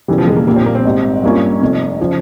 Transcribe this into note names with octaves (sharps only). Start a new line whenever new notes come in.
E1 E2 C#3 E3 G3
F3
G#3
A#3
A#1 A#2 G3 A#3
C4
A#3
C4
G#1 G#2 G3
G2 G3 A#3 C#4 F4
F1 F2 C3
C#3 F3